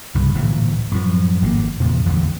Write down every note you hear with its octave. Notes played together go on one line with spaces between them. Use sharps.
C2 G2 C#3
D1 A#2 E3
F#2 A2 F3
G#1 E3 A#3
E2 A#2 C#3 F3
A1 E2 D3